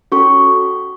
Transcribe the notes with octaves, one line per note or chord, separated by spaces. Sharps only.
C#4 F#4 A4 C#6